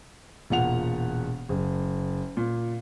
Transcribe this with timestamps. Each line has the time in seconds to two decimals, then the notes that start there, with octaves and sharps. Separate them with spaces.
0.50 E1 A#2 F#5 F7
1.49 F#1
2.37 A#2